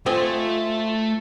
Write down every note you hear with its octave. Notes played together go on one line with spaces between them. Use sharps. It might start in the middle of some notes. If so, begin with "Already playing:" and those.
A3 C4 F4 D#5 G#5